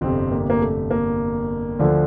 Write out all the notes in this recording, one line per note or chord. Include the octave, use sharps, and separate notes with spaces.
G1 F2 C3 C4
A#3
A#3
A3
A#3
D2 D3 F3 D4